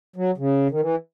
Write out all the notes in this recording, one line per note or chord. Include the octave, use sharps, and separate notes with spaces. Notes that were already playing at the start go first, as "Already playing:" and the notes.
F#3
C#3
D#3
E3